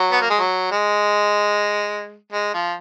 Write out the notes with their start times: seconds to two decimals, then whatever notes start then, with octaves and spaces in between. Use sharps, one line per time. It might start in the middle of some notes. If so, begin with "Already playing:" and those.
Already playing: F#3
0.12 B3
0.21 A#3
0.30 G#3
0.40 F#3
0.71 G#3
2.32 G#3
2.54 F3